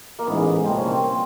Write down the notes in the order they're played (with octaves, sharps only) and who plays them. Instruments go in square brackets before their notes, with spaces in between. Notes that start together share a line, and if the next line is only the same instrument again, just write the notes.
[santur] A#3
[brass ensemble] A1 G#2 E3 G#3 [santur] B3
[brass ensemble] C2 A#2 F3 A#3 [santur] C4
[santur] C#4
C4